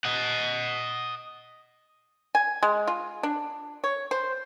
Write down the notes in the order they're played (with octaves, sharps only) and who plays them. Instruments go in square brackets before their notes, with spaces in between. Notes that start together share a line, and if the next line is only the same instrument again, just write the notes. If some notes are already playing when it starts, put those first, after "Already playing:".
[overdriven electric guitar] D#5 F#5
[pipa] G#5
G#3
F4
D4
C#5
C5